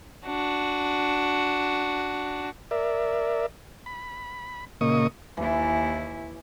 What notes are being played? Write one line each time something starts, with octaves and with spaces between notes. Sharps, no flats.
D4 F#4
A#4 D5 E5
B5
A#2 C#3 A#3 D#5 C#6 D#6
D#2 E3 E4